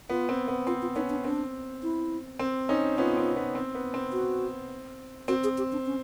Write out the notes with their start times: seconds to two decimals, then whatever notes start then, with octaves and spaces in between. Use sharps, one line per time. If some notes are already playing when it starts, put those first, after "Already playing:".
0.10 B3 F4
0.29 C4
0.48 B3
0.67 C4 F4
0.82 F4
0.96 B3 C#4 D#4
1.10 D4
1.24 C4 D4
1.83 E4
2.39 C4
2.69 C#4 D#4
2.98 B3 C#4 F4
3.17 C4
3.36 B3
3.55 C4
3.75 B3
3.94 C4
4.13 F#4
5.28 C4 F#4
5.44 G#4
5.58 G4
5.72 D4
5.86 C#4